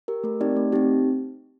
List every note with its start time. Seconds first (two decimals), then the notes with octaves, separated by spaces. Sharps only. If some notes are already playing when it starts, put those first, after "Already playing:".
0.08 G4 A#4
0.24 A3 A#4
0.41 C4 D#4 G4 D5
0.56 A3
0.72 C4 D#4 G4